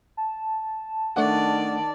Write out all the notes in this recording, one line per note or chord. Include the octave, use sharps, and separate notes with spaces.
A5
D#3 A3 D4 D5 F#5